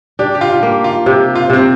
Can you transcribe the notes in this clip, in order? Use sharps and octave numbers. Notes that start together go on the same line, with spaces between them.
D4 G4
G4
F4
F4
A#3 G4
F4
C3 G4
F4
C3 C4